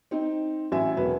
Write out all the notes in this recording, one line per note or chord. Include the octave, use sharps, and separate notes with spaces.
C4 D#4
A1 F#3 E4 E5 G#5
E1 F#3 B4